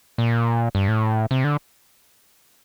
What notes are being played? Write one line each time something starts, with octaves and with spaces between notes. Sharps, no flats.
A#2
G2
A2
C3
D3